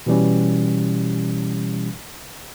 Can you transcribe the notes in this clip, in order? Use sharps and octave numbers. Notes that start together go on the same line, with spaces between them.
B2 E3 G3 C#4